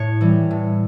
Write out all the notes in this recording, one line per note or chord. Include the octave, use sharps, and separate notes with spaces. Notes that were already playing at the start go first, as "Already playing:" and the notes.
Already playing: A2 C#5
E3 G3
A2